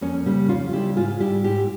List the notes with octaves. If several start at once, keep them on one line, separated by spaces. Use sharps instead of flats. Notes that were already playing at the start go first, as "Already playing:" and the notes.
F2 A#3 C#4
C#3 G3 A#3
F2 C#4 F4
C#3 G3 E4 G4
G#2 F4 G#4
G3 E4 G4
G#2 E4 G4